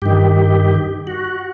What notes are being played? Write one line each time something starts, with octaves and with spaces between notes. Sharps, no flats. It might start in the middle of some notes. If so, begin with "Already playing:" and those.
G2 D#3 G4
F#4